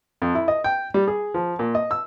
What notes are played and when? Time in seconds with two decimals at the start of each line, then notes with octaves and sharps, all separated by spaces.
0.22 F2
0.35 E4
0.48 D#5
0.64 G5
0.94 G3
1.08 G#4
1.34 F3
1.59 A#2
1.75 D#5
1.91 E6